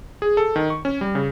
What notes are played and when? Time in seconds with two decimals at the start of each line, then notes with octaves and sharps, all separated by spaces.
0.22 G#4
0.37 A4
0.56 D#3
0.70 C#6
0.85 C#4
1.01 G3
1.15 C#3